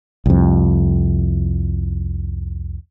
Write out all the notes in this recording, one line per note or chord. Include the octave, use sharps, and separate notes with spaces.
C2 F2